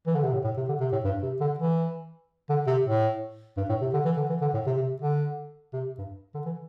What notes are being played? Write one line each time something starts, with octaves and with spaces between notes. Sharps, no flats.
E3
D3
C3
A2
A2
C3
D3
C3
A2
G2
C3
D3
E3
D3
C3
A2
G2
A2
C3
D3
E3
D3
E3
D3
A2
C3
C3
D3
C3
G2
D3
E3